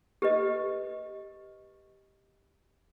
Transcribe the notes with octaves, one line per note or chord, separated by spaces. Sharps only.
G4 B4 D#5